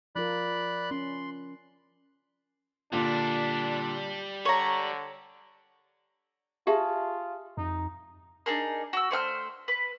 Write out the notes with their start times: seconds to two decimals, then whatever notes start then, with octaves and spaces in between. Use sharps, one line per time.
0.16 F3 F4 A#4 D5 B5 F#6
0.91 C#4 C6
2.92 A#2 D3 G3 D4
4.45 D3 C#5 A#5 F#7
6.67 F4 G4 G#4 E5 A5
7.57 F2 D#4
8.46 D4 D#4 G#4 A#4
8.93 F#4 E6
9.11 A3 C5 F#5 F6
9.68 B4